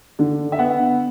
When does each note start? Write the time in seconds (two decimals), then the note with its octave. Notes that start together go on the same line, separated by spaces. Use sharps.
0.19 D3
0.52 E5
0.59 B3 F#5